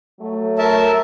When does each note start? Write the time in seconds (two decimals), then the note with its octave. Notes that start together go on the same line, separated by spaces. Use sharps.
0.19 F#3 A3
0.58 A#4 E5 A5